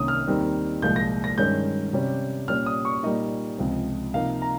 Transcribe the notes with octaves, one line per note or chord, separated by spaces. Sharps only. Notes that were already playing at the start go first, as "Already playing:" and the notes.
Already playing: C2 C3 D#3 A#3 C#4 D#6
F6
D#2 D#3 G3 C4 D#4
C2 A#2 F3 G#3 G6
A#6
A#6
G2 D#3 G#3 C#4 G6
C3 G3 C#4
A#2 G3 C#4 F6
D#6
C#6
A#2 G3 A#3 D#4 D#5
C#2 C3 F3 C4
C3 F3 A#3 D#4 F5
A#5